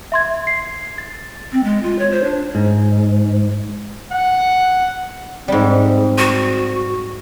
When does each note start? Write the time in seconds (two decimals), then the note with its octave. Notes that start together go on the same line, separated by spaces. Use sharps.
0.12 E5 C6 G#6
0.47 C7
0.98 A6
1.52 C4
1.64 G#3
1.83 F4
1.99 C#5
2.12 C5
2.24 D4
2.55 G#2
4.12 F#5
5.48 G#2 G3 C4
6.18 F#4